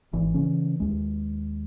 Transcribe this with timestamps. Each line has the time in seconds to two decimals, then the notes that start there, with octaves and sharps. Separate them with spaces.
0.13 G#1 E3
0.34 C#3 E3 C#4
0.80 D#2 G#3